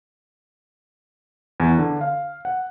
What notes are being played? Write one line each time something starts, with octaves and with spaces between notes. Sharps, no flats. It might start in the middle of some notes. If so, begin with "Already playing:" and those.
E2
D3
F5
F#5